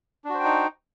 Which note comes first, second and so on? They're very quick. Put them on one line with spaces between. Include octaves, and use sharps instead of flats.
D4 F#4 C5 G5 D#4